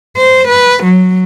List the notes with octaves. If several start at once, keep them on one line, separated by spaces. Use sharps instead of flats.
C5
B4
F#3